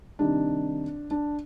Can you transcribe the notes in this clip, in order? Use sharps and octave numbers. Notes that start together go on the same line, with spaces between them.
C3 D#3 G3 D4
D4